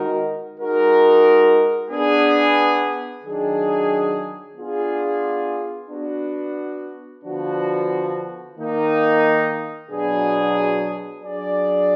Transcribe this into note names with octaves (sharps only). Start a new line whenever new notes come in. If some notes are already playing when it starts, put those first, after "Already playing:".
Already playing: D#3 G#3 D#4 F#4 A#4
G#3 D#4 F#4 A#4
B3 D4 G#4
D#3 F#3 D4 G#4
B3 D4 F4 G#4
B3 D4 F#4
D3 F3 B3 D4 F#4
D#3 A#3 D#4
B2 F#3 B3 D4 G#4
F#3 D4 G#4 D5